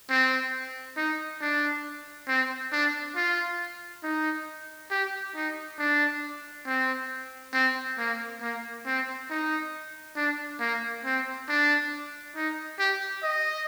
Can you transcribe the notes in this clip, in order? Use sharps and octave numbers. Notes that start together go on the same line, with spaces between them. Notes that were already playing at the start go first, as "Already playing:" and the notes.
C4
D#4
D4
C4
D4
F4
D#4
G4
D#4
D4
C4
C4
A#3
A#3
C4
D#4
D4
A#3
C4
D4
D#4
G4
D#5